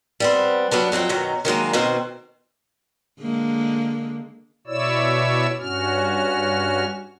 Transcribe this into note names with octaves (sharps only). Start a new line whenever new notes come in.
G3 B3 C4
F#3 G3 B3 D4
F2 F#3 C4 G5
F#2 B2 D#3 F#3
D#3 F#3 G#3 A#3
B2 D#3 C4
D3 G#3 A#3
B2 E4 C#5 D5 E6
G2 C#4 F#4 F6